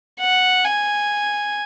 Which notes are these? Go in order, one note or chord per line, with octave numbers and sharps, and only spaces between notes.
F#5
G#5